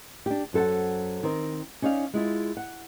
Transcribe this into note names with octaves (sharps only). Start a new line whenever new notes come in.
D4 G4
F#2 F#3 A4 C5 F#5
D#3 C4 A#4 C5
C#4 D#4 C#5 D5 F5
G#3 E4 F4
F#5